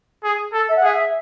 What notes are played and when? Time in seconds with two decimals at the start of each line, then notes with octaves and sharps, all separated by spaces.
0.24 G#4
0.53 A4
0.69 E5
0.76 F#5
0.83 G#4 E5